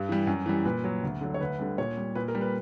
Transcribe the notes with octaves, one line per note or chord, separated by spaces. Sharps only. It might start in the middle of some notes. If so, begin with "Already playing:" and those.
Already playing: G2
E3 G3
F#2
E3 G3
A#2 B4
F#3
D2
D3 F#3
C#5
D2 B4
D3 G3
A#2 C#5
G3
A#2 B4
A#4
G3
B4